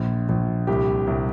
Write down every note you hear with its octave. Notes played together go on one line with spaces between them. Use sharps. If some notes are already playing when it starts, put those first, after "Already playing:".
Already playing: A#1 F4
A#1
C2 G4
C2